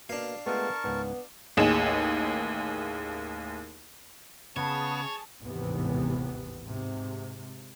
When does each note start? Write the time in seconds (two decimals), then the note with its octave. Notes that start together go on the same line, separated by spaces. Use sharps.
0.09 B2 A#3 D4 F5
0.46 G#3 A3 B3 F4 A#4 A5 C#6
0.84 C#2 G#2 B3
1.57 A1 D#2 G#4 E7
4.56 C#3 B3 G#4 C#5 A5
5.41 G#1 D#2 A2 C3 E3 B3
6.64 G#2 C3